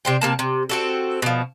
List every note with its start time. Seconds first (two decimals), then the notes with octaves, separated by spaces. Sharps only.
0.05 C3 C5 G5
0.21 C3 A#3 A5
0.39 C3
0.69 C4 F#4 A4
1.22 B2 F3